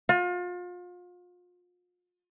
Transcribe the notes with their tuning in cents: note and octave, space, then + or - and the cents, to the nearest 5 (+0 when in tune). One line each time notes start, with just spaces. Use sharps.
F4 +35